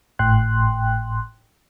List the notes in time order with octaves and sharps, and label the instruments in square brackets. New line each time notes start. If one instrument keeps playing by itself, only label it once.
[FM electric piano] G#1 A2 G5 C6 F#6